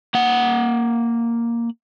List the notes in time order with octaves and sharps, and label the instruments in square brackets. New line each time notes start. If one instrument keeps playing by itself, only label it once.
[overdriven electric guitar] A#3 F#5